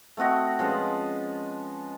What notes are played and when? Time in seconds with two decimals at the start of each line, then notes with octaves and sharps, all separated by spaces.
0.17 A3 C4 F#4 D#5
0.59 F3 G#3 C#4 B4